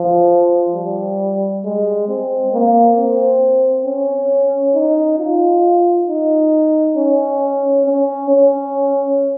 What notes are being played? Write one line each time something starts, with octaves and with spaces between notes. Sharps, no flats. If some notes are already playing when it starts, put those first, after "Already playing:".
Already playing: F3
G3
G#3
C4
A#3
C4
C#4
D#4
F4
D#4
C#4
C#4
C#4